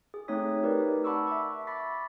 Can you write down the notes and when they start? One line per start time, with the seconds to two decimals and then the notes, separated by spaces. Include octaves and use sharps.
0.14 G#4
0.28 A3 C4 D#4 C#5 D#6 B6
0.63 D#4 G4 A#4 B4 D5
1.04 F#5 A5 B5 C#6 D6 E6
1.27 E5 C#6
1.67 B5 C#6 D6 A6 B6